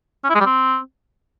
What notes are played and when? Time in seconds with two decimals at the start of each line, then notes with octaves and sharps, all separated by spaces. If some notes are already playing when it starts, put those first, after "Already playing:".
0.24 C#4
0.29 E4
0.35 G#3
0.40 G3
0.46 C4